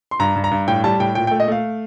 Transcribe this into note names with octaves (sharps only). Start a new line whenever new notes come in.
C6
G2 A#5
G2
A#5
G2
A2 G5
G3 A5
A2 G5
A#2 G5
G5
A3
D#5
A3 F5